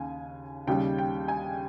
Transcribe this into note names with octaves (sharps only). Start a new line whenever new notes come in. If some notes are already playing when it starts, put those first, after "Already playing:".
Already playing: D#2 C#3 G#5
D#2 C#3 G3 G5
G5
G#5